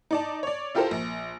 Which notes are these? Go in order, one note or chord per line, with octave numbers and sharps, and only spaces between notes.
D#4 D5 A5
C#5 D5
E4 F4 G4 A4 A#4 C5
A#1